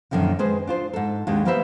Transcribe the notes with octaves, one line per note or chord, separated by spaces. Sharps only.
F#2 A#2 D3 D#3 F3
G#3 G#4 B4 C5
D4 F4 C5
G#2 A4
D#2 C3 G#3 D4
G3 A#3 B3 B4 C5 E5